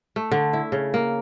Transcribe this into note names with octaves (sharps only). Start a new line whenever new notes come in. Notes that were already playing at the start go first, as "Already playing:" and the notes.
A3
D3
E4
C#3
A#3